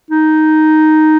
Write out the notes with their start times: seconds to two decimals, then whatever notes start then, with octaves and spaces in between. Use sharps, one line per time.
0.11 D#4